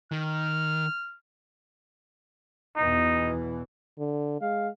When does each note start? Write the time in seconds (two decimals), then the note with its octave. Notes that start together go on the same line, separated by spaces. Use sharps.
0.12 D#3 F6
2.76 E2 B2 E3 D#4
3.99 D3
4.41 G#3 F5